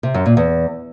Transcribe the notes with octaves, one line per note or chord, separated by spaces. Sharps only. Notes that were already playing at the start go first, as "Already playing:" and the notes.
C3
F#2
A#2
E2